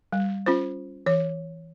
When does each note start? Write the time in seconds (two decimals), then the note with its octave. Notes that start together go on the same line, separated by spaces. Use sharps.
0.12 G3
0.46 C#4 F4 C5
1.06 E3 C#5